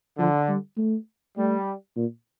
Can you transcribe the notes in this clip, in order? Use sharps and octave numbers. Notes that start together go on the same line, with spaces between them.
D3 F3
G3
A3
G3 A3
A#2